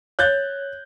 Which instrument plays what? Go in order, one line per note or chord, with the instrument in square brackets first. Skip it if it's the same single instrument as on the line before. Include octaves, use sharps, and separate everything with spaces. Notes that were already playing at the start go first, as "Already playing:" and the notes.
[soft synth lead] C#5 [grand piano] F#6 G6 A6